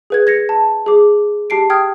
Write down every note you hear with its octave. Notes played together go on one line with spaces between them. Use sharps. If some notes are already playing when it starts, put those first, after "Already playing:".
G#4 B4 G#6
G#6 A#6 C#7
A5
G#4 D6
G4 A5 C7 D7
G5 D#6 F6 G#6